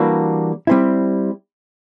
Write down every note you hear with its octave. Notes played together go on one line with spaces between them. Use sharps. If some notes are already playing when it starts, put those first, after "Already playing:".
Already playing: E3 G3 A#3 D4 F#4
G3 C4 E4